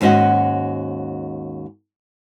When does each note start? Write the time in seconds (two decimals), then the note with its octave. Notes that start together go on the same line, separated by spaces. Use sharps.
0.01 D#2 G#2 C#4 F#4 D#5 F#5